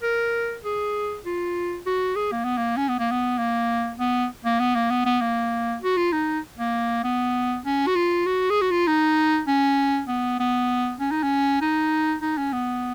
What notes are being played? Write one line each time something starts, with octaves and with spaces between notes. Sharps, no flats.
A#4
G#4
F4
F#4
G#4
A#3
B3
A#3
C#4
B3
A#3
B3
A#3
B3
A#3
B3
A#3
B3
B3
A#3
F#4
F4
D#4
A#3
B3
C#4
F#4
F4
F#4
G#4
F#4
F4
D#4
C#4
B3
B3
C#4
D#4
C#4
D#4
D#4
C#4
B3